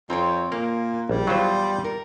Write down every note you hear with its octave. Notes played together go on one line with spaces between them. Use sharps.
F2 C4 C#5
A#2 A#3 A#4
A#1 G3
E2 F#3 F4 F#4 C5
A#4